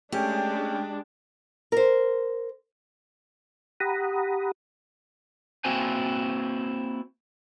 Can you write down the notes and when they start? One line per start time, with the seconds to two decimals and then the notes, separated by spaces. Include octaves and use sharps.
0.12 G#3 A3 C#4 D4 G4 G5
1.72 A#4 C5
3.80 G4 F#5 A#5 B5 D#6
5.64 A#3 C4 E4 F#4 C5 G#5